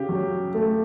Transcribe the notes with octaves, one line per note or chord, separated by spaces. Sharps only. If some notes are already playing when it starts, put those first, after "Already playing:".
Already playing: C#3 G4
F#3
A3